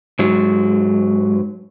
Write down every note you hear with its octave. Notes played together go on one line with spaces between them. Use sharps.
G#2 F#3